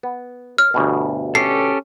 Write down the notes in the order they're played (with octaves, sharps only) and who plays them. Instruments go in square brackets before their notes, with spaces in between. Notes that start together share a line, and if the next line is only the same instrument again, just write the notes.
[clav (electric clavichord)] B3
[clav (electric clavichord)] C#5 [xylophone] F6
[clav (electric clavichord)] G1 D2 B2
[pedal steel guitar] C#4 G4 A4 [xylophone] C7